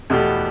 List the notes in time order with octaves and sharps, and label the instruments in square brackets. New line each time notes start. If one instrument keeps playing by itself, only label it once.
[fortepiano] E2 B2 A3 G4